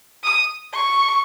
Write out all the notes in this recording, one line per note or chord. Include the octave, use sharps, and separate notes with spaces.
D#6
C#6